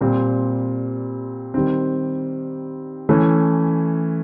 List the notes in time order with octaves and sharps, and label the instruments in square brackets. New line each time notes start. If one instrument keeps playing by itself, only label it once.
[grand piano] A#2 G3 C4
D#3 G3 C4
E3 A3 C#4